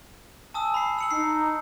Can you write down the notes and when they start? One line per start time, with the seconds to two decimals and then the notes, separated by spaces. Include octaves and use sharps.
0.54 G#5 A5 D#6 E6
0.74 B5 C7
0.99 E6 C#7 F#7
1.11 D#4 C7